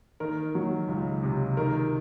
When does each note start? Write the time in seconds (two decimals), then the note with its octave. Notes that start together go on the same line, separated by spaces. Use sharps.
0.20 D#3 A#4
0.55 F#3
0.88 C#2
1.23 C3
1.57 D#3 A#4